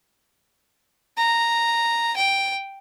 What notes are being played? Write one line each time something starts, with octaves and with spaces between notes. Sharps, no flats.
A#5
G5